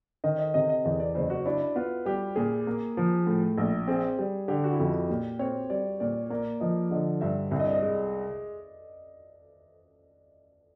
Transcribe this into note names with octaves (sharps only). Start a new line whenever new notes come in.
D#3 D#5
D#5
C3 D#5
D#5
E2 D#5
D5
F#1 C5
F#4
D4 E4
B3 F4
G3 G4
A#2 G#4
A#3
F3
A2
A#1
C4 G#4
G3
D3 G4
F#4
E4
F2 F4
F#4
A#2 G4
C4 C#5
G3 D5
A#2 D5
A#3 D5
F3 D#5
D3 D#5
G2 E5
C2 E5
D#5
D5
D#5
G#3